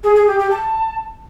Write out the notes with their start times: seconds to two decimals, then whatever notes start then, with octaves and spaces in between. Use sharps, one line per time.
0.04 G#4
0.15 G#4
0.27 G4
0.39 G4
0.51 A5